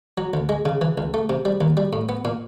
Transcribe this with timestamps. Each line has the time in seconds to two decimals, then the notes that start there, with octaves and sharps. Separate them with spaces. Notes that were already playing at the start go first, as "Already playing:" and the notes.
0.18 F#3
0.34 D2
0.49 G#3
0.65 C#3
0.81 E3
0.98 C#2
1.14 A3
1.29 C3
1.45 G3
1.61 D#2
1.77 G3
1.93 A2
2.09 B3
2.25 A#2